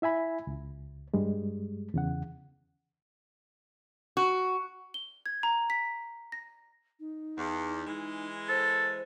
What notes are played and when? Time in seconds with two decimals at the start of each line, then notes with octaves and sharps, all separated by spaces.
0.02 E4 E5 G#5 B5
0.47 C#2
1.14 G2 G3 G#3
1.94 E2 C#3 F#5
4.17 F#4
4.94 G7
5.26 G#6
5.43 A#5
5.70 B6
6.32 A#6
7.00 D#4
7.38 E2
7.87 E3 G#3
8.49 A4 C5